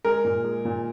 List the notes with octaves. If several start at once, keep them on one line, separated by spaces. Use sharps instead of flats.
G#3 A#4
A#2
G#3
A#2